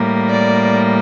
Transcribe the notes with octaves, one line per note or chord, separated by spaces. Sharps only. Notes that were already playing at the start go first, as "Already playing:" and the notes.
Already playing: A2 G3 A#3
D5